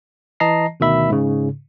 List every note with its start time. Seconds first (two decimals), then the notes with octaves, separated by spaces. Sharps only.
0.40 E3 D#5 A5 A#5 A#6 C7
0.80 D2 B2 D#3 E5 B5
1.09 G#2 C#3